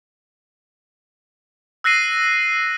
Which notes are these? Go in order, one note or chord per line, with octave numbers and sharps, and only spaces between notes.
E6 F#6 A#6 C7 D#7